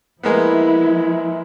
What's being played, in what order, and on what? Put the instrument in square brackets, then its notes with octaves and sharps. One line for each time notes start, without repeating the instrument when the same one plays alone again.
[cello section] F3 E4 [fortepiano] G#3 A#3 B3